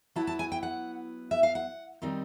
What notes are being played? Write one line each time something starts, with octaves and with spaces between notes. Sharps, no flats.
F#3 B3 E4 A5
A5
G#5
G5
F#5
E5
F5
F#5
D#3 G3 C4 D#4